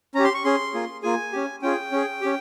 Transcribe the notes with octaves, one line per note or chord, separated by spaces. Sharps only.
C#4 G4 A#5
C6
C#6
C#4 G#4 C6
A#3 F4 G#4
A#3 F4 G#4 G#5
C#4 G4
C#4 F4 G#4 G5
C#4 G#4
C#4 G4